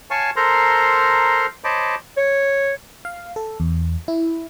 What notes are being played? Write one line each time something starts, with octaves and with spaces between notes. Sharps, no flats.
C#5 F5 G#5 A5 C#6
A4 A#4 C5 A#5 C6
C5 C#5 D#5 A5 B5 D6
C#5
F5
A4
E2
E4